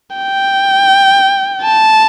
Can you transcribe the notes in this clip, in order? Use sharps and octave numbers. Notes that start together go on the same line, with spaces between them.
G5
A5